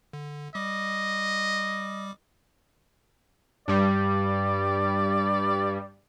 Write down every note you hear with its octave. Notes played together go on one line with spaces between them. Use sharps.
D3
G3 D#5 D6
G2 G3 D5